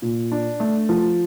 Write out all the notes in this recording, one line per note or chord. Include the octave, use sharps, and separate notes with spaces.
A#2
D4
A3
F3